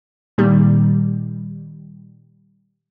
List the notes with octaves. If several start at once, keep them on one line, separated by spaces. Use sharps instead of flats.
A#2 D#3 G3